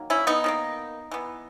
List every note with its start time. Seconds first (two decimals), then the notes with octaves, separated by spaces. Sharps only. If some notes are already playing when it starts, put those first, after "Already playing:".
Already playing: D#3 F#3 A#3
0.10 C#4 E4
0.27 B3 D#4
0.44 D#3 F#3 A#3
1.11 E3 B3